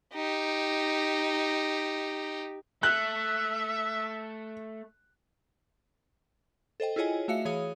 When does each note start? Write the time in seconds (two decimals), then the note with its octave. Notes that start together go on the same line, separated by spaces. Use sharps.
0.14 D#4 G4
2.83 A3 E5 F#6
6.80 A4 C5 D#5 G5
6.96 E4 F4 G#4 C#5 D#5 G#5
7.28 A3 F#4 E5 F5 C#7
7.45 E3 G#4 C#5 F5 D#6